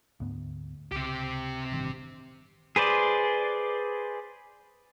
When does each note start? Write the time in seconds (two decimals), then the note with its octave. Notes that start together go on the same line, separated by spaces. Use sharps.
0.20 D2 G#2 B3
0.92 C#2 C3 G4
1.72 A1 G2 D#3
2.76 G#4 B4 C5 D5